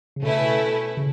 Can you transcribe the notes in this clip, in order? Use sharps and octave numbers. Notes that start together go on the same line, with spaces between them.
C#3
B2 A3 C#4 E4 B4
C#3